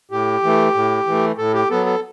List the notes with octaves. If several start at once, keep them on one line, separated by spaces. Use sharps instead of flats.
A2 G4
E3 A3
A2
E3 A3
A2 A4
G4
F#3 B3 A4
A4